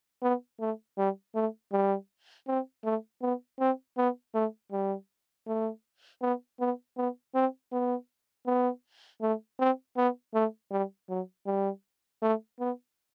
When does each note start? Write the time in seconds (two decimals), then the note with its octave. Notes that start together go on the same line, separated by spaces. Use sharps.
0.22 B3
0.60 A3
0.97 G3
1.35 A3
1.72 G3
2.48 C4
2.84 A3
3.22 B3
3.59 C4
3.97 B3
4.34 A3
4.72 G3
5.47 A3
6.21 B3
6.60 B3
6.97 B3
7.34 C4
7.72 B3
8.46 B3
9.22 A3
9.59 C4
9.97 B3
10.34 A3
10.71 G3
11.09 F#3
11.46 G3
12.22 A3
12.59 B3